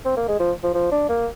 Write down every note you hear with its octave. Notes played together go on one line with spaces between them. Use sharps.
C4
A#3
G#3
F3
F3
F3
D4
A#3